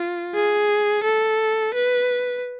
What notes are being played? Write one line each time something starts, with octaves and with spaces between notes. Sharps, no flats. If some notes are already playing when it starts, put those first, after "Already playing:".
Already playing: F4
G#4
A4
B4